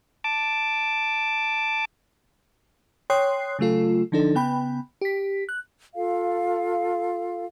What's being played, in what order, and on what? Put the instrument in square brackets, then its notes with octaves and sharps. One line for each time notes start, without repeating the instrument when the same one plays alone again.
[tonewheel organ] A5 D6
[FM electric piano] C#5 G5 C6 D#6 F#6 C7
C#3 F#3 A3 F4 A4
D3 F3 D4 D#4 A4
C#3 B3 G5 B5
G4 B6
F#6
[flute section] F4 A4 F5